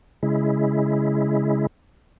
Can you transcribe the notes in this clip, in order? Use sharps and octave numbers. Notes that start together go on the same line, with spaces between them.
C#3 G#3 E4